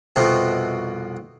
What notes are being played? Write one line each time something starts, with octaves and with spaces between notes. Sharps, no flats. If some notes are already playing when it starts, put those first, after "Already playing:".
C2 F2 B2